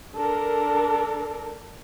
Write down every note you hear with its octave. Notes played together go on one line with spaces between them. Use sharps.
D4 A4 A#4